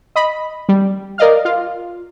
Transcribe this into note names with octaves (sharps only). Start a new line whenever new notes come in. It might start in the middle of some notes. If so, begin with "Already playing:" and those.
D#5 B5
G3
A#4 D5 D#5 F5 F6
F4